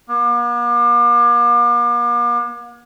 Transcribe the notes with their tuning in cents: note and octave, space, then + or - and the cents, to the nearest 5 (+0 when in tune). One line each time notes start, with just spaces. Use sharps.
A#3 +45